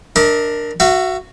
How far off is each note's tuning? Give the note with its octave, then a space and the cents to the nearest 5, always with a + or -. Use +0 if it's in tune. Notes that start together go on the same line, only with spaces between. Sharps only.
D4 +10 A#4 +0 D#5 +45
F#4 +0 E5 +40